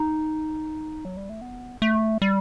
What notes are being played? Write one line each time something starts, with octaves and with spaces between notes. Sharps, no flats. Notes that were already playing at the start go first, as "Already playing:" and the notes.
Already playing: D#4
F#3
G3
A3
B3
A3
G3